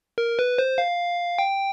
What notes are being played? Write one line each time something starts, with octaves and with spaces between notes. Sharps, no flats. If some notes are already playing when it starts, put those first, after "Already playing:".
A#4
B4
C5
F5
G5